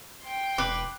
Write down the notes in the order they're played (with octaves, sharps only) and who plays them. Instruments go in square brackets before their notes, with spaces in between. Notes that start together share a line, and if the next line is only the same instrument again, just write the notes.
[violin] G5 C6
[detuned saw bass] E1 [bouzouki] B4 [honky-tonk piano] D6 F#6